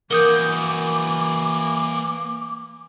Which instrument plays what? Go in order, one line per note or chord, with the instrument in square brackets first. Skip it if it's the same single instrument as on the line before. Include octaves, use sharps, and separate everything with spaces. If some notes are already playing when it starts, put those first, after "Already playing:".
[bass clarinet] E3 [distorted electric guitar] A#3 F#4 [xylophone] A#4 D#6 G6 [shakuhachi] D6